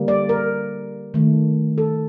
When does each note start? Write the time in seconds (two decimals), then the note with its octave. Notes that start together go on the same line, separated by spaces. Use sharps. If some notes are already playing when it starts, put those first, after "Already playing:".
Already playing: D3 G3 A#3
0.08 D5
0.29 A#4
1.14 D#3 A3
1.78 A4